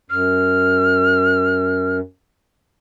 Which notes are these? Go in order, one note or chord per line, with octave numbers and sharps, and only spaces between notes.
F#2 F6